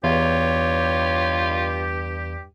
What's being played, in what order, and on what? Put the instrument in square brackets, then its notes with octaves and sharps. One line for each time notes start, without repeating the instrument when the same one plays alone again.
[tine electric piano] E2 [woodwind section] G2 G4 [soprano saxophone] F4 [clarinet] C#5